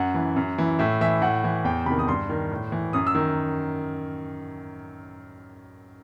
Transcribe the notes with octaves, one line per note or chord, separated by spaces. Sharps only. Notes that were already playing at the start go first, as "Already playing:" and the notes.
Already playing: F#2 F#5
E3
F#2
E3
A2 E5
E3 E5
A2 F#5
E3
E2 G5
C3 D#3 B5
D#6
G2 C6
D#3
A2
E3
F#2 D#6
E6
D#3